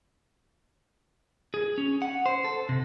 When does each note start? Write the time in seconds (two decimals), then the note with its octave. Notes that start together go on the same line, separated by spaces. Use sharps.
1.54 G#4
1.78 C#4
2.02 F#5
2.26 C5
2.44 A4
2.69 C3